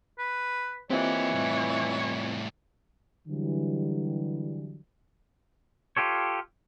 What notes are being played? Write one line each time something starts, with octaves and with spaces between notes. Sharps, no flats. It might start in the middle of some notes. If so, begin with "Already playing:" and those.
B4
E3 A#3 C4 F4 G4 C#5 D#5
A2 G3
D3 E3 F#3 G3
F4 G4 A4 C#5